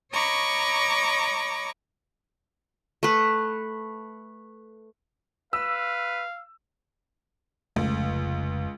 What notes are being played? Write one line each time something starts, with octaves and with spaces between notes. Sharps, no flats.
C#5 D#5 A#5 B5 C#6 D6
A3 B4
B4 F5 E6
F1 C#2 C#3 A3